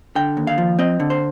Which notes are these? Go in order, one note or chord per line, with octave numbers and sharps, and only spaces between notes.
D3 G5
D#2
F5
F3
C4 D#5
D3
C5